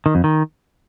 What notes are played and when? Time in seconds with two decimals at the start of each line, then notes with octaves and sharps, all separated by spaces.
0.06 D#3
0.15 F2
0.24 D#3